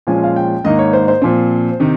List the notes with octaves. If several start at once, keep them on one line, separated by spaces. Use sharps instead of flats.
A#2 F3 G#3 C#4 F4 G#5
F5
G5
G#2 D#3 A#3 D#4 D#5
C#5
C5
C5
A#2 F3 C4
C3 D#3